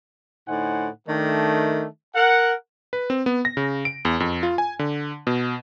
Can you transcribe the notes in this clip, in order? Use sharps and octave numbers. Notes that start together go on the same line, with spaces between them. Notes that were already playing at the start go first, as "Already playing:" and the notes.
A2 D3 D#4 C5 F#5 G#5
D#3 A3 D4
A#4 F#5
B4
C4
B3
A#6
C#3
D7
E2
F2
F4
G#5
D3
B2